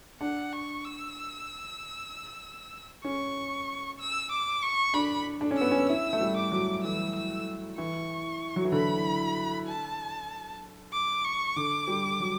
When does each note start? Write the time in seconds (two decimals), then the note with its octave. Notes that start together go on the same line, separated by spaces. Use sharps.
0.21 D4 F#5
0.53 C#6
0.84 E6
3.04 C#4 C#6
4.00 E6
4.32 D6
4.63 C#6
4.94 D4 B5
5.41 D4
5.51 C#4
5.57 B3 E6
5.71 C#4
5.89 E4 E6
6.13 A3
6.21 G3
6.36 D6
6.51 F#3
6.84 E3 E6
7.15 E6
7.78 E3 C#6
8.56 F#3
8.65 E3
8.72 D3 B5
9.67 A5
10.93 D6
11.25 C#6
11.56 D3 D6
11.88 G3
12.20 F#3